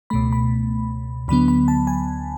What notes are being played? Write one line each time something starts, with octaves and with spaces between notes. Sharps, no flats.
C#2 B2 A3 B5
B5
D2 D3 F#3 B3 B5
B5
A5
G#5